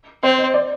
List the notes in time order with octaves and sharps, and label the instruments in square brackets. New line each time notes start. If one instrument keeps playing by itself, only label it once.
[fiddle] C4 [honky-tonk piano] C5
[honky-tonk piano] D#5
D5